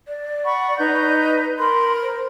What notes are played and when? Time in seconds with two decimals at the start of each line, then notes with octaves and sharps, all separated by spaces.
0.08 D5
0.45 F#5 B5 C#6
0.78 D#4 B4 G6
1.59 A#4 B5 C6
2.03 C5